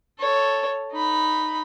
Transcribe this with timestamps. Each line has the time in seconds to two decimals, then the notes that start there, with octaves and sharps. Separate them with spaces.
0.20 A4 C#5
0.92 D#4 B5